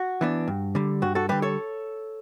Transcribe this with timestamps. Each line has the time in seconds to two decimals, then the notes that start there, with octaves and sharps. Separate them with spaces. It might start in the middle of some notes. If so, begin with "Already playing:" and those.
Already playing: F#4
0.21 E3 B3 D4
0.48 G2
0.75 D3 G3
1.02 G2 F#4
1.15 F#4 A4
1.29 D3 G3 G4 B4
1.42 A4 C#5